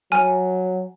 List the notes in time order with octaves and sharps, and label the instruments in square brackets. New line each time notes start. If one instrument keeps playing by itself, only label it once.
[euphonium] F#3 [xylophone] G#5 F6